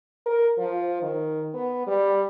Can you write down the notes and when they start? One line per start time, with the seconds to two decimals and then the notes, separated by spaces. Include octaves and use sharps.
0.26 A#4
0.57 F3
1.02 D#3
1.54 B3
1.87 G3